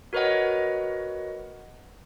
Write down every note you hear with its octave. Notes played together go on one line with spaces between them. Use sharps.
F#4 A#4 B4 C#5 D#5 F#5